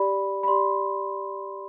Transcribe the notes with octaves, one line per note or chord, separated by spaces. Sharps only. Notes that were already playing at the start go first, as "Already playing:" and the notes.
Already playing: G4 D5 B5
B5
G4 D5 C6